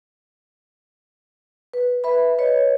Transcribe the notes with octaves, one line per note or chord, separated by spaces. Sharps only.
B4
B4 E5 B5
B4 C#5 D#5